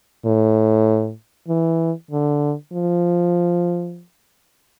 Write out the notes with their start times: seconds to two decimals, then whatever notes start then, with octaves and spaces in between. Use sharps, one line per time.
0.25 A2
1.49 E3
2.11 D3
2.72 F3